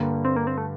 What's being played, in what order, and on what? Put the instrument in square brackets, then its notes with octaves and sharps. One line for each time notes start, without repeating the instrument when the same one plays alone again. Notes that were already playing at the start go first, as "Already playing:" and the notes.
Already playing: [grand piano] G2 D3 G3 [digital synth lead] A#3
[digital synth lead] C4
A#3
C4
A3